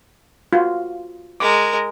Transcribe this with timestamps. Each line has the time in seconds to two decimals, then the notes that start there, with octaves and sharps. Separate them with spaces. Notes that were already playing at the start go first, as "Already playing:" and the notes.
0.53 F4 F#4
1.40 G#3 A#4 D6